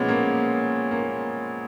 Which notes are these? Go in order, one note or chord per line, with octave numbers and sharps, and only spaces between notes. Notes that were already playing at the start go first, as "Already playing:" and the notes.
Already playing: A#2 F3 G#3 B3 C#4
A#3
A#3